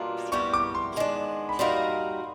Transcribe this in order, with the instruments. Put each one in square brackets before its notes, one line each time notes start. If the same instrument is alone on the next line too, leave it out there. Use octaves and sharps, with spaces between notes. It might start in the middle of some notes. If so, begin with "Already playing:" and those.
Already playing: [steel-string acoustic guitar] B2 G3 A#3 D4 F4 [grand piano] C6
[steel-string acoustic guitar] G3 B3 E4 G4 A#4 [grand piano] C#6
[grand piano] D6
C6
[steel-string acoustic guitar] D#3 G#3 B3 D4
[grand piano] B5
[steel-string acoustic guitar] G3 A#3 D#4 F#4 A#4 [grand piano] C6